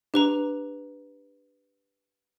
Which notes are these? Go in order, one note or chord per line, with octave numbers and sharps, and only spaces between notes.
D4 G4 B4 A#5